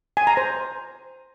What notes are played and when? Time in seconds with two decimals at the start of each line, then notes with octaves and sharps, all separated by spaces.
0.17 G#5
0.27 A#5
0.37 C5